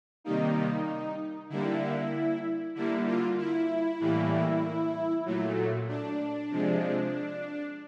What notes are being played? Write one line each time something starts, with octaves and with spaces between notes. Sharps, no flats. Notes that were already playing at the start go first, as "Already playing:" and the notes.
C3 D#3 G3 A#3 D#4
D3 G3 A#3 E4
D3 G3 A#3 E4
F4
E4
A2 E3 G3 A#3
A#2 F#3 A3
D4
C3 F3 G#3